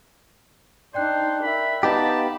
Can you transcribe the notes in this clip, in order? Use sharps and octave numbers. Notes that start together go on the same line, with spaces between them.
D4 D#4 C5 D5 G5 F#6
A#4 E5 B5
B3 D#4 G4 F5 A5 B5